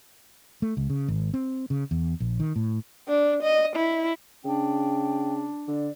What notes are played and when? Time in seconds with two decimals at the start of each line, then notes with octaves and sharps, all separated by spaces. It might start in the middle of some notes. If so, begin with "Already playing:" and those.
0.62 A3
0.77 C#2
0.90 C#3
1.08 G#1
1.34 C4
1.70 C#3
1.91 E2
2.20 A#1
2.40 D#3
2.56 A2
3.08 D4
3.43 D#5
3.76 E4
4.45 C#3 D4 G5
5.68 D3 D5